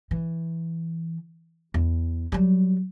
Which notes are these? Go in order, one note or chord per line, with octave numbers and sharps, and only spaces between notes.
E3
E2
F#3 G3